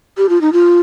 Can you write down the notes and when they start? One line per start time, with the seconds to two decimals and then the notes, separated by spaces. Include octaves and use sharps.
0.17 G4
0.29 F4
0.41 D#4
0.53 F4